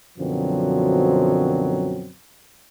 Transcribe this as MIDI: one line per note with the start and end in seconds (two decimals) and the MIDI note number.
0.18 2.11 42
0.18 2.11 47
0.18 2.11 50
0.18 2.11 53
0.18 2.11 54
0.18 2.11 60